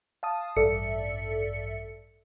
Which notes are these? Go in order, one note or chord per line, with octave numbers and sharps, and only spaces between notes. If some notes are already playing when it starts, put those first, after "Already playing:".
F5 A5 D#6
A1 G2 A4 D5 E5 C#7